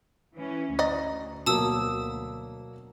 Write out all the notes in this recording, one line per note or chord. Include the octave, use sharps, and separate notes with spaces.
E3 C#4
D2 D5 D#5 A#5
B2 F#3 A#3 A5 D#6 E6